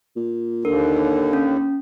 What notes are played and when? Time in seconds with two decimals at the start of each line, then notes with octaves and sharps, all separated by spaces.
0.16 A#2
0.65 D#2 D3 A#4
1.33 C#4